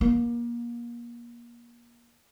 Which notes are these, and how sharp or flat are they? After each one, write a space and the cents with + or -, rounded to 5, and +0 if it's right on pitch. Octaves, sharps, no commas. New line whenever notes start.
A#3 +30